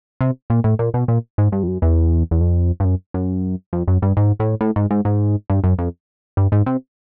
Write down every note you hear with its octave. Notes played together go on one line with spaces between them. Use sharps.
C3
A#2
A2
A#2
B2
A#2
G#2
G2
F2
F#2
E2
E2
F2
G2
F#2
F#2
F2
F#2
G2
G#2
A2
A2
G#2
G#2
G#2
G2
F#2
F2
G2
G#2
C3